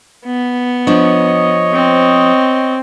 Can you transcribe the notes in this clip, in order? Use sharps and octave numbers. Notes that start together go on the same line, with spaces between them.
B3
F3 D4 C#5 D#5
C4